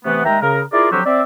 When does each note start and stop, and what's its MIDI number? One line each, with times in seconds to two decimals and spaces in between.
0.05 0.25 48
0.05 0.25 52
0.05 0.25 57
0.05 0.25 59
0.25 0.37 39
0.25 0.37 56
0.25 0.37 76
0.25 0.37 79
0.25 0.37 82
0.42 0.61 49
0.42 0.61 70
0.72 0.89 64
0.72 0.89 65
0.72 0.89 68
0.72 0.89 70
0.72 0.89 74
0.92 1.01 50
0.92 1.01 53
0.92 1.01 54
0.92 1.01 60
0.92 1.01 66
0.92 1.01 67
1.06 1.22 60
1.06 1.22 74
1.06 1.22 76